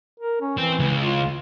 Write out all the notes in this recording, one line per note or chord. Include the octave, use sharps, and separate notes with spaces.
A#4
C#4
E3 C4
C#2
F4